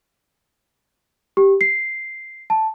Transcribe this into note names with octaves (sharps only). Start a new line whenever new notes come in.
G4
C7
A5